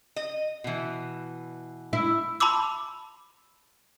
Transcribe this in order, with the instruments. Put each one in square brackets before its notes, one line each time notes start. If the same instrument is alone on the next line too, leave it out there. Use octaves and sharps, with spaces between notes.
[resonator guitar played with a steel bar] D#5
B2 E3
[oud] E4
[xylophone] A5 B5 C6 D6 E6